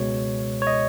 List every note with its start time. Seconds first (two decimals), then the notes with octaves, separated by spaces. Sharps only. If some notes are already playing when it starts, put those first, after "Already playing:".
Already playing: C#2 B2 G#3 C#5
0.62 C#5
0.67 D#5